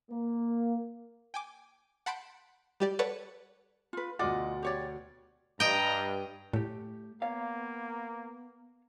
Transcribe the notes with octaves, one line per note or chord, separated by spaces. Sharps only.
A#3
G5 G#5 D6
F#5 A5 B5 C6 G6 D7
G3 G4 D5
A4 B4 C#5 D5 F#5 A5
F4 B4
D2 B2 F4 D5 D#5 F#5
G4 C#5 D5
G2 D#5 G5 A#5
A2 A3 G4
A#3 B3 C#5 F5